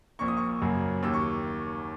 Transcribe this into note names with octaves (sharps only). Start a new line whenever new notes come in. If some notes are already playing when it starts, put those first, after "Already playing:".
A#1 A#2 A#3 C#6
D#6
C#6
F#2 C#3 F#3 A#3
D#2 D#3 A#3 E6
C#6